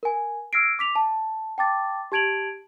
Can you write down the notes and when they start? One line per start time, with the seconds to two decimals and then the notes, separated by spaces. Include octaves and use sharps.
0.03 A#4 G#5
0.53 E6 F6 G#6 A#6 C7 D7
0.79 D6 B6 F7
0.95 A5
1.58 G5 A5 D6 A6
2.12 G4 A5 G#6 D7 F7 F#7